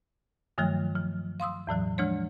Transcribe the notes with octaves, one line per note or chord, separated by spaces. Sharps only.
G2 D#3 F3 F#3 A3
F3
F5 C6 D#6 E6
E2 A2 E3 F#3
E3 F3 G#3 D4 C#5